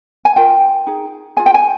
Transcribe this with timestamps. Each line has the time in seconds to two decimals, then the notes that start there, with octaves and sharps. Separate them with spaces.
0.25 G#5
0.36 F4 A#4 G5
0.87 D#4 G#4
1.37 F4 G#4 G#5
1.46 G5
1.54 G#5